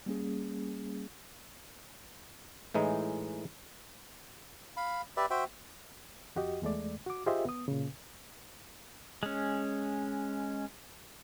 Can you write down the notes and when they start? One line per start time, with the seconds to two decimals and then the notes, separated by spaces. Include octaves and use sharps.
0.06 G3 A#3 C#4 G#4
2.74 A2 E3 G#3 D#4
4.77 F5 B5
5.17 G4 B4 D5 E5
5.30 F#4 C5 E5 G5
6.36 F2 F#4 G4 D#5
6.62 E2 G#3 A3 D5
7.06 F#4 D6
7.26 F4 G4 G#4 C5 D#5 E5
7.45 B3 D#6
7.68 A#2 C#3
9.23 G#3 C#4